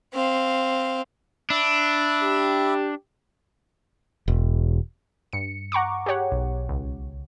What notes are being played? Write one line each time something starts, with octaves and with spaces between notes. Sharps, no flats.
C4 F5
D4 E5 B5
G4
E1
G2 C#7
F#5 A#5 C#6 D6
G4 G#4 C#5 F#5
B1
C#2